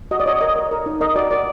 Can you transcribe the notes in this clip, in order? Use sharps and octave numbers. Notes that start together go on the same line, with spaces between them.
F#4 D#5
D5
C#5 D#5
A#4 D#5
A#4
A#4
D#4
A#4 D#5
F#4 D5
A#4 D5